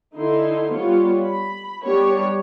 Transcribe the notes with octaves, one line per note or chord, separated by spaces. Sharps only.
D3 D#4 E4 A4 C6
G3 B3 F4 C#5
B5
G3 B3 D4 G4 C#5